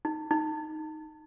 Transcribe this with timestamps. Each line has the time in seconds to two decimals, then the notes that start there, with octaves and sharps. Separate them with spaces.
0.05 D#4
0.31 D#4